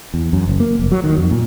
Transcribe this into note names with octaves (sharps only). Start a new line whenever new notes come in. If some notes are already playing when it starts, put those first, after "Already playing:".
E2
F#2
F#1
A#3
F1
F#3
D#3
F2
A#2